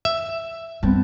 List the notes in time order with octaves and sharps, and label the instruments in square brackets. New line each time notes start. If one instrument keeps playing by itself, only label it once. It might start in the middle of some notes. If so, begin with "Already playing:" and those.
[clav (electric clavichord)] E5
[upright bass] G2 [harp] B3 C4 A5